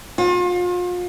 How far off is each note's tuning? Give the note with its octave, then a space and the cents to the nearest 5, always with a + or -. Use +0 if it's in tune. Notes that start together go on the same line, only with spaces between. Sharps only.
F4 +35